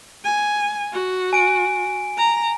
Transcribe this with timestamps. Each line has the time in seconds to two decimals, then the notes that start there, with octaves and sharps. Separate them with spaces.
0.24 G#5
0.92 F#4
1.33 G#5 D7
2.17 A#5